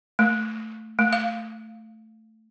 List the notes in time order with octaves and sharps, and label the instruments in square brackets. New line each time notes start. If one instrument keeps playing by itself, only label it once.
[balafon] A3
A3
F5